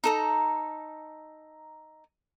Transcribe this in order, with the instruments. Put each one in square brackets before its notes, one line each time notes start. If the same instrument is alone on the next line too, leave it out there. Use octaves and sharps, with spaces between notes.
[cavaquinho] D#4 A4 A#5